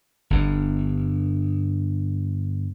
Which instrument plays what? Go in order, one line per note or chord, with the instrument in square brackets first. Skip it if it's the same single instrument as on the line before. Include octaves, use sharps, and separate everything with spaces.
[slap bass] G1 G2